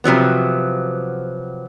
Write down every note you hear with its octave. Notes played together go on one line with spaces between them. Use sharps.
C3 F3 F#3 B3